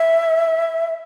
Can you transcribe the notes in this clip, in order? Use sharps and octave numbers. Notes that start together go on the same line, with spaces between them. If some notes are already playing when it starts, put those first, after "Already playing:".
Already playing: E5